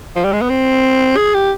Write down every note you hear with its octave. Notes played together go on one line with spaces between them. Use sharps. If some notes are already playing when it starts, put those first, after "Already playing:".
F3
G3
G#3
B3
C4
G#4
G4